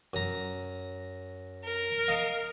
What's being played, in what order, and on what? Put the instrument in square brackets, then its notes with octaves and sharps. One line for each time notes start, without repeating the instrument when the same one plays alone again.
[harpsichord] F#2 A#5
[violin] A#4
[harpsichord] D#5 F5